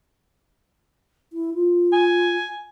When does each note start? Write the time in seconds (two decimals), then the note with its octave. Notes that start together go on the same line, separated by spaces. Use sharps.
1.33 E4
1.54 F4
1.93 G#5